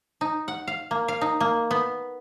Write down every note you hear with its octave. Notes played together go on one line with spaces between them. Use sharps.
D#4
F#5
F5
A#3
F5
D#4
A#3
B3